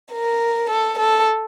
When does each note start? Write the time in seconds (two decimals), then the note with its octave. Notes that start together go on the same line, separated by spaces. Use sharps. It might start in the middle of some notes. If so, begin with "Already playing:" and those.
0.13 A#4
0.70 A4
0.99 A4